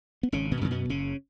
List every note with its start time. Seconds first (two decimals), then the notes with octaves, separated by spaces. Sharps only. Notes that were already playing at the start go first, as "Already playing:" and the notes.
0.23 B3
0.32 G#1 C#3 C#4
0.51 B2 B3
0.61 F#2 C#3
0.71 B2 B3
0.89 F#1 C#3 C#4